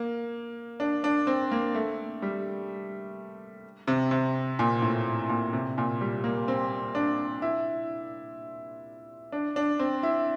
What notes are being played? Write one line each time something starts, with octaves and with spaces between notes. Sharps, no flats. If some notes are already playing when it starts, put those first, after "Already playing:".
Already playing: A#3
D4
D4
C4
A#3
A3
G3
C3
C3
A#2
A2
A#2
C3
A#2
G3
A#3
C4
D4
E4
D4
D4
C4
E4